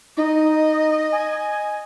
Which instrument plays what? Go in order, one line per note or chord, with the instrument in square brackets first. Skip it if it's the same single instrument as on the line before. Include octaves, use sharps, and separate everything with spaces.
[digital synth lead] D#4 [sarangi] D#5
[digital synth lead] G#5